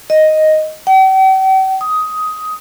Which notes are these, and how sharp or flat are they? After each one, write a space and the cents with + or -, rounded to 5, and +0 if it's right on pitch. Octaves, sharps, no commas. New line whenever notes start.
D#5 +0
G5 -45
D#6 +10